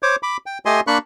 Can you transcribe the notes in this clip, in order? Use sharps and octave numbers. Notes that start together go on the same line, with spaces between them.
C5 C#5 D6
B5 D6
G5
A3 G4 D#5 G#5 C6
A#3 D4 B5 C#6 F#6